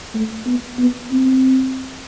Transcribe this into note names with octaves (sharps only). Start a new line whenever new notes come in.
A3
B3
B3
C4